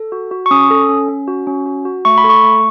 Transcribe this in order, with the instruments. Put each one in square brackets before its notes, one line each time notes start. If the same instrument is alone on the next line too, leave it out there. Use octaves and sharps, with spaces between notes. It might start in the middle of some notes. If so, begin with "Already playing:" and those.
Already playing: [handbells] A4
F#4
F#4
C#6
C#4 D#6
A4
C#4
C#4
F#4
C#4
F#4
F#4
A3 C#6
B5
A4
C#6
A3